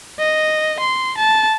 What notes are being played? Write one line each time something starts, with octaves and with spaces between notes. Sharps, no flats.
D#5
C6
A5